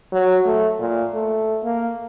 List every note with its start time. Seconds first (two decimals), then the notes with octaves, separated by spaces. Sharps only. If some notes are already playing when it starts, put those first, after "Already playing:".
0.12 F#3
0.46 A3
0.80 A#2
1.14 A3
1.64 A#3